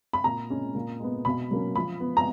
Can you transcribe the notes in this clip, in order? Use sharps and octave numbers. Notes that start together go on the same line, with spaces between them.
B5
A#2 A#5
G#3 C#4
A#2
G#3 B3
B2 B5
F#3 A#3 C#4
F3 B5
B3
A#5